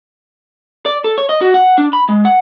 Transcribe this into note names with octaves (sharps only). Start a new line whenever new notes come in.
D5
A4
C#5
D#5
F#4
F#5
D4
B5
G#3
F#5